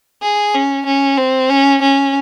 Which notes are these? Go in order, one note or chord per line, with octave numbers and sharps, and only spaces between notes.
G#4
C#4
C#4
C4
C#4
C#4